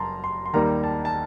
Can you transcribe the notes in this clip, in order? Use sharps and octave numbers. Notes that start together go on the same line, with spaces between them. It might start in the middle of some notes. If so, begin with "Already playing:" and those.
Already playing: F#1 F#2 A5 A#5 C6
C6
C6
D#2 D#3 G3 A#3 A#5
A5
A5